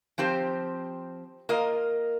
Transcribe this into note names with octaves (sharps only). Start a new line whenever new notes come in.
F3 C4 G4 C5
A#3 F4 A#4 D#5